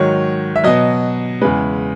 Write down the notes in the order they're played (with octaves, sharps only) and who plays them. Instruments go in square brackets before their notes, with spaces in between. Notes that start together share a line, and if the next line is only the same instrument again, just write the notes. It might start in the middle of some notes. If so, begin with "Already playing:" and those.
Already playing: [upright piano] G#2 D#3 F#3 C#5
E5
B2 F#3 D#5
E2 C#3 G#3 B4